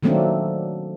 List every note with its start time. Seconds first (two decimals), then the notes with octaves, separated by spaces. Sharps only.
0.03 D#3 F#3 A3 A#3 C4 D4